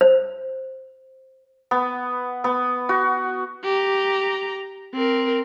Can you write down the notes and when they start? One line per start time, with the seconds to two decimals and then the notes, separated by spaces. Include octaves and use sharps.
0.01 C5
1.71 B3
2.44 B3
2.89 F#4
3.64 G4 A#5
4.94 C4 A#4